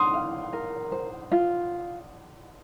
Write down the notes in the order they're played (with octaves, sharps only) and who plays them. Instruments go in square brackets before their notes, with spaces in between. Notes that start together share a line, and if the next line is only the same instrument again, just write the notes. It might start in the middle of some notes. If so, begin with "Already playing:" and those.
Already playing: [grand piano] C6 D#6
[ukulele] F5
A#4
C5
F4